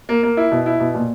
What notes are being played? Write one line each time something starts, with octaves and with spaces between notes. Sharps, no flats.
A#3
A#3
E4
B2
E4
B2
A#2